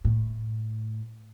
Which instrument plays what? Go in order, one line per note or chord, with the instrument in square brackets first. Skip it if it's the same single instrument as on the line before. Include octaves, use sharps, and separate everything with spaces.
[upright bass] A2